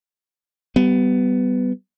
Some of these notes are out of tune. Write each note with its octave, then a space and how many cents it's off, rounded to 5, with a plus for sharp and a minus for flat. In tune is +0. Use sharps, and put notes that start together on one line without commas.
G3 -20 B3 +15